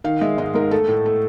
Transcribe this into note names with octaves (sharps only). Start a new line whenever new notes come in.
D#3 F5
G#3 E5
G#2 D#5
G#2 A#4
A3 A4
A2
A3